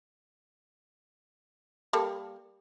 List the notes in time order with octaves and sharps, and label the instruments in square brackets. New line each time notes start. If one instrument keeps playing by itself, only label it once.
[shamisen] G3 A#3 A4